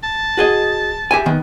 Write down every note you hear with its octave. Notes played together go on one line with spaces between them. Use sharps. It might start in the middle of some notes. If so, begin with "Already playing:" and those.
A5
F#4 G#4 D#5
G4 E5 G#5
D#3 B3